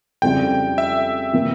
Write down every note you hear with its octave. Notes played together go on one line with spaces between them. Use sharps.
F2 C#3 G3 C4 E4 G5
E5
C3 E3 A#3